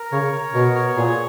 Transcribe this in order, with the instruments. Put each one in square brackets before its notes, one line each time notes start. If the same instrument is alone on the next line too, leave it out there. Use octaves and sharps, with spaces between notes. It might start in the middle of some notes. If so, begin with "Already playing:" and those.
Already playing: [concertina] A#4
[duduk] C#3 [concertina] C#5
[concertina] A#4
[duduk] B2 [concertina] B3
[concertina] C#5
[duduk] A#2 [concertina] G#4